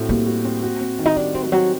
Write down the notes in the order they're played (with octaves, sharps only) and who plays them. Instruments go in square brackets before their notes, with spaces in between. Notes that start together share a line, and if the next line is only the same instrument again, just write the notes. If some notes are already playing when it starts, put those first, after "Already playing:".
Already playing: [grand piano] A2 C4 F#4
[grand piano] G3 [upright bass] A#3
[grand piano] F#4
C4
F#4
C4
D#3
[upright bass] D#4
[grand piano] G3 [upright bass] D4
[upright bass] C4 [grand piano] F#4
[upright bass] D#3
[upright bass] F#3 [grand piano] C4